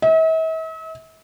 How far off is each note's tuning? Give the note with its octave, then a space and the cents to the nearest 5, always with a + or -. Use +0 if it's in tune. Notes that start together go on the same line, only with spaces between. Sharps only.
E5 -45